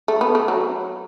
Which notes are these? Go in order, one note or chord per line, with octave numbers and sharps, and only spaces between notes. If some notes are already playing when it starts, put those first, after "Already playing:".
A3
B3
A3
F#3